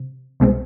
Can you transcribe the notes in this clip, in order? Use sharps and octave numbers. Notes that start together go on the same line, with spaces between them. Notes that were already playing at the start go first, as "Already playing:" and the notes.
Already playing: C3
C2 B2 G#3 C4